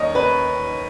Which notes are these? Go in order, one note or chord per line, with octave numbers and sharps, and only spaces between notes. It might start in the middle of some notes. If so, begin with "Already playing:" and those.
Already playing: D#2 D#3 C#5 D#5
B4